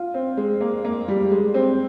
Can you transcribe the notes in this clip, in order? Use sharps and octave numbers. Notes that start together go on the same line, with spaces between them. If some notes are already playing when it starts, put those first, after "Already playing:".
Already playing: F4
C4
G#3
A#3
A#3
G3
G#3
C4